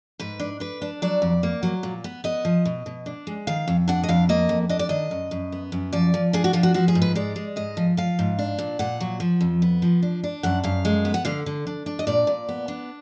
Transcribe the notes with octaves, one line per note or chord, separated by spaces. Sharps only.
G#2 B4
D4
D4 B4
D4
F#3 D5
F2
A#3
F#3
A#2
B3
B3 D#5
F3
B2
B2
D4
G#3
D#3 F5
F2
D4 F#5
D#5
F2 F5
A#3 D#5
F2
D4 D#5
D5
D#3 D#5
F#2
F#2
B3
F#2
F3 D5
F3
D4 G#4
F#4
F3 F4
F#4
F3 F#4
G#4
G#2
B4
G#3 D5
G#3
G#2 D#5
F3
F3 F5
G#2
D4
A#2
A#2 F#5
F#3
F3
F2
B3
F3
D4
D4
F#2 F#5
F#2 F5
G#3
B3
F#5
D3 F5
D3
D4
D4
D#5
A#2 D5
A#2
B3
D4